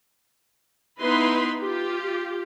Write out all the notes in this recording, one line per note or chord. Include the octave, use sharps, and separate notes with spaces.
B3 D#4 E4 B4 B5 C6
F4 G4